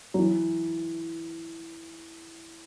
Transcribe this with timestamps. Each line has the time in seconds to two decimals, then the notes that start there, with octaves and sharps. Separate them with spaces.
0.14 F#3
0.19 E3